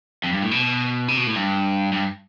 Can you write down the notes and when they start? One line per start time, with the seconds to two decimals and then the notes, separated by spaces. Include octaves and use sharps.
0.24 F2
0.33 G2
0.43 A2
0.51 B2
1.08 C3
1.17 B2
1.27 A2
1.36 G2
1.93 G2